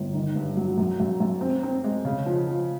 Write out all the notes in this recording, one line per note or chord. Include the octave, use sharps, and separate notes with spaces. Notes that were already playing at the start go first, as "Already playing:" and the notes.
Already playing: G1
D#3
G2
F#3
F#2
F#2
F#2
C4
C4
G#3
C#3
F3
F3